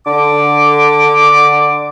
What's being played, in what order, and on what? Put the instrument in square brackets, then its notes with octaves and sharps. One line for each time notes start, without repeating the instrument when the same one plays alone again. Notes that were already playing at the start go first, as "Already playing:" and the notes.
[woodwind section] D3 D6